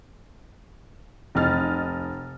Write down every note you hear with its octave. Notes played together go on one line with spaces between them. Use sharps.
F1 D#5 F6 A6